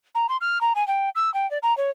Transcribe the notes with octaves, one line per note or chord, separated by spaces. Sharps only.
A#5
C6
F6
A#5
G#5
G5
E6
G5
D5
A#5
C#5